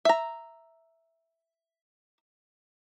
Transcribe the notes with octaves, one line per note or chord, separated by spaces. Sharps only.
E5 A#5